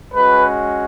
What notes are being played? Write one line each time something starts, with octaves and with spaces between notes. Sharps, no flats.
G#3 C#4 F#4 B4